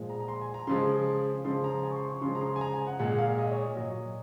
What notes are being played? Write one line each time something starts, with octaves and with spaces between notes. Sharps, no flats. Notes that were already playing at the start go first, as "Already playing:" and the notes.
Already playing: A#2 F3 G#3
A#5
A#5
C6
G#5
A#5
C#3 F3 G#3 C6
C#3 F3 G#3 C6
A#5
G#5
C#6
C6
C#6
C#3 F3 G#3 C6
A#5
C6
G#5
A#5
G#5
F#5
A#2 G#3 F#5
F5
D#5
C#5
D#5
A#2 F#3 D#5